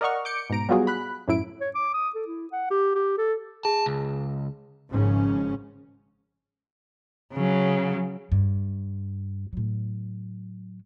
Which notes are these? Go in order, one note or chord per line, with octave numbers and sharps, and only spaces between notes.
A#4 D5 D#5 F#5 C#6 F6
D6 G6 C#7 D7
G#2 B2 A#5 D7
F#3 G3 B3 F4 F#4 G#4
B5 F#6
F#2 A2 E4 D7
C#5
D6
D#6
A4
E4
F#5
G4
G4
A4
G#4 A5
C#2
G#1 G#2 C#3 F3 C#4
C#3 F#3
G2
A2 F#3